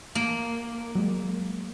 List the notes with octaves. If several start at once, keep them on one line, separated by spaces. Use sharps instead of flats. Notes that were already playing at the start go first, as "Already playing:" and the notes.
A#3
F#3 G#3